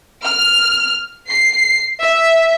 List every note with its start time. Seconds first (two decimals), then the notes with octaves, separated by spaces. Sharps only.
0.24 F6
1.26 C7
2.01 E5